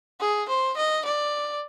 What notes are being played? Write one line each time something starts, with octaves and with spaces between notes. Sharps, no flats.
G#4
C5
D#5
D5